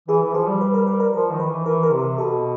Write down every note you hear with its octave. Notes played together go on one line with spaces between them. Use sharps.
E3 G#4
E3
F3 G#4
G3
B4
A#4
B4
A#4
F3 A#4
D#3
B4
E3
E3 A#4
A#4
C3
B2 A4